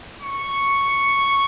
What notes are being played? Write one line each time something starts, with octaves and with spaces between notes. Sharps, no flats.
C#6